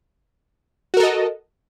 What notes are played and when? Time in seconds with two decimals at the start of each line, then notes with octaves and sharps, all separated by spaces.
0.94 F#4
0.97 A#4
1.00 A4
1.03 D#5